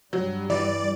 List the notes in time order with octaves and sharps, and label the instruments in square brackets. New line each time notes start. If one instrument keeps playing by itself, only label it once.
[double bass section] G2 G3 [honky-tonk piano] F#3
[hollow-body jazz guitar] E3 [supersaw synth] D5